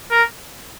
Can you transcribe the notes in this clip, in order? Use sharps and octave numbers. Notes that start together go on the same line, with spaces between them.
A#4